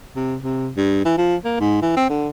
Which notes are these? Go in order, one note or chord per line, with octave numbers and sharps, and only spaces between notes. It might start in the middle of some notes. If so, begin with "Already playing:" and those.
C3
C3
G2
E3
F3
A#3
G#2
E3
C4
D3